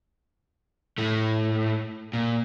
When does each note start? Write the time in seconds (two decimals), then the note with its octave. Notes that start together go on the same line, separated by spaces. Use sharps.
0.98 A2 A3
2.13 A#2